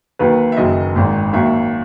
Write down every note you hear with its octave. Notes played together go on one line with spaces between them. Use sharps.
D#2 D#3 F#3 B4
E5
F#1 F#2 D#3 F#3 D#5
G#1 G#2 D#3
D#2 D#3 F#3 E5